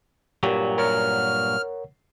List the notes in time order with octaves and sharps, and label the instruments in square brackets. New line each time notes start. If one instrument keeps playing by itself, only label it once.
[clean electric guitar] G2 A#2 F#3 [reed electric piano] G4 A#4
[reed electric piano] A#4 C#5 F#5 [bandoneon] F6